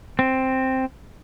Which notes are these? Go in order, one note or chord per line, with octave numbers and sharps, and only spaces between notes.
C4